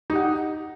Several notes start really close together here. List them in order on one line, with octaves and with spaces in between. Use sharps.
D#4 G4 F#5